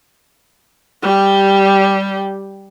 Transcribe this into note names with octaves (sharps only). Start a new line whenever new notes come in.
G3 G4